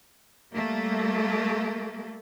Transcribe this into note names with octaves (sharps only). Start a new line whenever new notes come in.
G3 A3 A#3